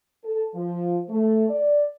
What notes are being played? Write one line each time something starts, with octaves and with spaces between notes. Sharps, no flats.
A4
F3
A3
D5